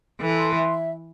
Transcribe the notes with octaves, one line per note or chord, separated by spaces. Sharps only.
E3 A4
C6
E5